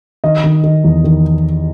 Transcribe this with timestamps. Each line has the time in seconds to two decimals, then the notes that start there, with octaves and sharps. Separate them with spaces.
0.24 D#3 D#5
0.44 D#3
0.64 D#3
0.84 E2
1.04 D#3